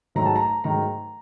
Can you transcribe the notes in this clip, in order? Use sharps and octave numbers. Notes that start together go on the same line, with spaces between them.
G#2 D#3 F#3 A3 A#5
A5
A#5
G#2 D#3 F#3 A3 A#5